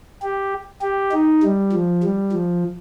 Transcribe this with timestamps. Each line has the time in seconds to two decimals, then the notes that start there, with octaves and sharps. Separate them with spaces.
0.22 G4
0.82 G4
1.12 D#4
1.43 G3
1.72 F3
2.03 G3
2.32 F3